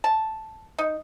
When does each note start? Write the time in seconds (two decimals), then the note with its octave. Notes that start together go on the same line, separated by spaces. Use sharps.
0.04 A5
0.79 D#4